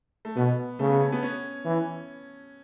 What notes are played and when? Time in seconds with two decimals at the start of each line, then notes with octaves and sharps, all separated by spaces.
0.25 A3
0.36 B2 B3
0.79 C#3 A3
0.90 B3
1.01 C#4
1.12 B3
1.23 C#4
1.65 E3